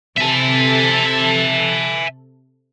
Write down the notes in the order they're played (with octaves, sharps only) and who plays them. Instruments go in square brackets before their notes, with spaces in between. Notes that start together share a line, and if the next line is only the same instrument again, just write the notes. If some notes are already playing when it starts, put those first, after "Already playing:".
[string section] C3 A4 [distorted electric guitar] E5 G#5